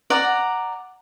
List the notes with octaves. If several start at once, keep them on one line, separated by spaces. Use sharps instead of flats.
D5 F#5 A#5